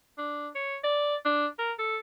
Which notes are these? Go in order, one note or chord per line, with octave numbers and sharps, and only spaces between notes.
D4
C#5
D5
D4
A#4
A4